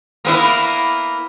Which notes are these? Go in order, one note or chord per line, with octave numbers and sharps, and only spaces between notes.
A#3 B3 E4